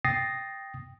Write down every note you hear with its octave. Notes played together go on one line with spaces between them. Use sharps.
G5 D#6 A6 A#6 C7